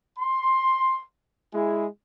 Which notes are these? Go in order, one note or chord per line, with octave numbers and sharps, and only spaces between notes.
C6
G#3 E4 G#4